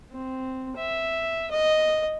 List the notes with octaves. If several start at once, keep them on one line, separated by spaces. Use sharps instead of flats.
C4
E5
D#5